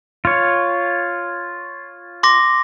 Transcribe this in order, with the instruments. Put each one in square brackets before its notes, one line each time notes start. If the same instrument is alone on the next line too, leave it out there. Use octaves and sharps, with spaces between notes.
[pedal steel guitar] F4 C#5
[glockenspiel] C6 D6 A#6